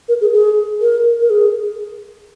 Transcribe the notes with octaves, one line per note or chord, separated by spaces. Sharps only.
A#4
G#4
G#4
A#4
A#4
G#4